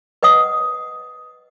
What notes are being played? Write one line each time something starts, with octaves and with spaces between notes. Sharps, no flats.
B4 D#5 F#5 D#6